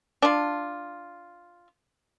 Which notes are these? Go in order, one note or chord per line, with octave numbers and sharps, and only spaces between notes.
D4 F4